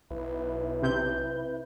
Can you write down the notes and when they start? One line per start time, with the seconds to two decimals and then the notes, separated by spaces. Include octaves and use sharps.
0.11 B1 E4 B4
0.82 C3 G6